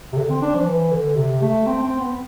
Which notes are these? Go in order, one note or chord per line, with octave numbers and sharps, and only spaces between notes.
C3
D3
C4
D4
F3
E3
D3
C3
A3
C4
C4
B3